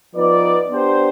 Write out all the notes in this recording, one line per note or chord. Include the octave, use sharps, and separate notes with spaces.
F3 B3 D#4 B4 D5
B3 D4 G4 C5